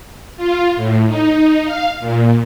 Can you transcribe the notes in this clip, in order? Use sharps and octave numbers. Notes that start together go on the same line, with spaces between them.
F4
A2
D#4
F5
A#2